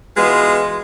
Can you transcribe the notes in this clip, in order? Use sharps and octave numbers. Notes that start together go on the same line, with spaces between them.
E3 G#3 B3 F4 F#4 D#5